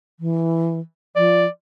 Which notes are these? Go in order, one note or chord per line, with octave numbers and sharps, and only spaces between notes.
E3
F3 D5